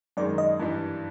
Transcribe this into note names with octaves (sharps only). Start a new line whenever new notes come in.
F#2 D#3 G#3 D5
D#5
G2 E3 G3